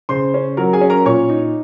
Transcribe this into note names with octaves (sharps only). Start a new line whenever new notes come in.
C#3 C5 C6
C#4
F#3 A#4 A#5
G#4 G#5
C#4
A#4 A#5
A#2 C#5 C#6
D#4